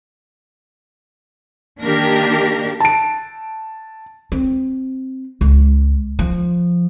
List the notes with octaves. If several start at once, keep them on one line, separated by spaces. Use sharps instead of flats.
D#3 A#3 D4 G4 A#4
A5 D7
C4
C#2
F3